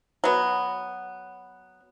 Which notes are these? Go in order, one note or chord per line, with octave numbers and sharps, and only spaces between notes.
F#3 B3